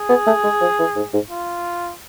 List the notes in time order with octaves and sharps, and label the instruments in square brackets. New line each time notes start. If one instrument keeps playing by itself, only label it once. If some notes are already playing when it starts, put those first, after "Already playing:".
Already playing: [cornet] G#4
[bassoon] B3
A3
G#3
F3
E3
G#2
G#2
[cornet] F4